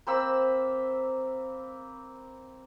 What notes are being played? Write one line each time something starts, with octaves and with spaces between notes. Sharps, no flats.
A#3 C4 B5 E6